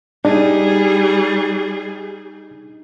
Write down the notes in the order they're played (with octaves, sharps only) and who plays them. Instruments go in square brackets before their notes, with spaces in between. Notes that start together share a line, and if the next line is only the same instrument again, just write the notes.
[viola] G3 G#4 [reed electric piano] D4 [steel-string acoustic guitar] D#4